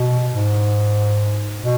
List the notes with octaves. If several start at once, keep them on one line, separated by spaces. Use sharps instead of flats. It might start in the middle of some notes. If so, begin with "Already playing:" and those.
Already playing: B2
G#2
B2